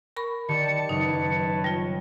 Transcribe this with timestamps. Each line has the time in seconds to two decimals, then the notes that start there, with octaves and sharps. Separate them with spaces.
0.17 A#4 B5 C#6
0.48 D#3 G4 D5 A5 C#7
0.89 F#1 D#4 B4 C#5 A5
1.64 G3 F4